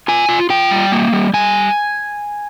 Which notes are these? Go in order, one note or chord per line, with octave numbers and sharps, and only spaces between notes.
F4 G#5
F4
F4 G5
G3
A#3
G3
G3 G#5